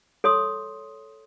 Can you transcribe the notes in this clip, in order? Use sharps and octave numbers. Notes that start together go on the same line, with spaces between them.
A4 C#5 C6 D#6